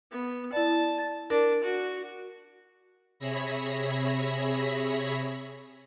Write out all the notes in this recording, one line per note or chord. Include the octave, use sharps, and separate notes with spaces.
B3
E4 D5 A5
D4 A#4
F#4
C3 G#4 C#5 E5 B5 A#6